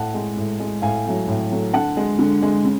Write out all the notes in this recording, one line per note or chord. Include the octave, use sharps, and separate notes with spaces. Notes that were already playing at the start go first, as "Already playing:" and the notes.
Already playing: A2 F#5 A5
G#3
A2
G#3
A2 F5 G#5
F#3 A3
A2
F#3 A3
D3 F#5 A5
G#3
D3
G#3
C#3